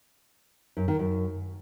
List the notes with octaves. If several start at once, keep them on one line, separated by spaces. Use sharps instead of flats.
F#2
D#3
F#2